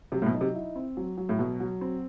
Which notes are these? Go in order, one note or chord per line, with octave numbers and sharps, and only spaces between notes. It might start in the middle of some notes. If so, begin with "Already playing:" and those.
C3 F#3
A2
B2
D#4
C3
E4
C4
F#3
F#3
A2
B2 F#3
F#3
C4